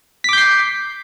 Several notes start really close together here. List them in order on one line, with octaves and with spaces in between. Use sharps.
B6 D6 G6 C7